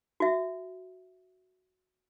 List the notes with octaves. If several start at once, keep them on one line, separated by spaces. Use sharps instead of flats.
F#4 E5